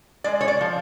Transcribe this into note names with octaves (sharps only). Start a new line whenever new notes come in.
G#3 D5
C#5
D5
F3